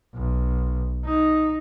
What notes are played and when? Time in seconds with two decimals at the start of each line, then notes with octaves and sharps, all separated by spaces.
0.15 B1
1.05 D#4